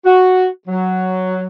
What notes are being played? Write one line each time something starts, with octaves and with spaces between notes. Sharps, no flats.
F#4
F#3